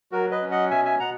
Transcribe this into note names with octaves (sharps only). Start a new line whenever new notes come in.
F#3 F#4 A#4
B4 D#5
C#4
D#5 F#5
B2 E5 G#5
E5 G#5
B2 F#5 A#5